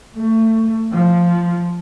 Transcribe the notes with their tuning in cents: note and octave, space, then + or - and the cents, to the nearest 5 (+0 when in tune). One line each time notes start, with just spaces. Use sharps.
A3 +25
F3 -5